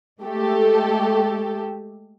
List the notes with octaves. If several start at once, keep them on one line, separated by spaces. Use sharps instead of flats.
G#3 A3 G4 A4